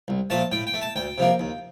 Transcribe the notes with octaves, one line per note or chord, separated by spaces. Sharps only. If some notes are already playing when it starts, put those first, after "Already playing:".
C2
A#2 F3 A3 A5
A2 G5
G5
A3
A5
D2 G5
C3 F3 A#3
D#2